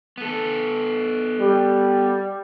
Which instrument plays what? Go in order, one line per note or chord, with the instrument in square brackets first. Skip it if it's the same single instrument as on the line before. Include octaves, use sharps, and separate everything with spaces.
[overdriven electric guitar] B3 A4
[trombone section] G3